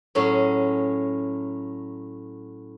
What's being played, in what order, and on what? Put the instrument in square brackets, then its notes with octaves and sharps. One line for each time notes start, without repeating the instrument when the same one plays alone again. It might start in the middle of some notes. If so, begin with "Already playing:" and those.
[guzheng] A2 F#3 C#4 G#4